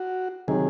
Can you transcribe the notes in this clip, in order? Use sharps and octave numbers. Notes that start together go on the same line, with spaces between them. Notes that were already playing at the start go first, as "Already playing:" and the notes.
Already playing: F#4
C3 D#3 F#3 G#4